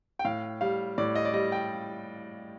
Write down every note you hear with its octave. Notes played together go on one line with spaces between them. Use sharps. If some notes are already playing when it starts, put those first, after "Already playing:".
G5
A2 F5
G3 F5
A2 D5
D#5
D5
G3 D#5
G5